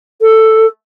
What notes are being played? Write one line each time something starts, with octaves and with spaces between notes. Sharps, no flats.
A4